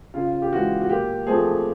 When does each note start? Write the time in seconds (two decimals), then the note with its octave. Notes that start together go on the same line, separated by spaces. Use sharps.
0.14 C#3 F4
0.42 G4
0.52 E3 G#3 F#4
0.82 F#4
0.90 A#2 G4
1.27 F3 A3 C4 G#4